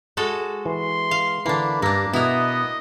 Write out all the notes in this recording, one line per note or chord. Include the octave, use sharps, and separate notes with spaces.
G#3 F#4 A4
E3 C6
F5
D3 E3 A#3 D4 B5
G2 A#3 D4 A#5
B2 B3 E4 A#4 D#5